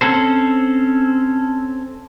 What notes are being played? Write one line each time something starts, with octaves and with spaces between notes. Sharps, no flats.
C4 C#4 A4 C5